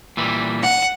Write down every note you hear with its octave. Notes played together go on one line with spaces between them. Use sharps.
A#2 E3 G3
F#5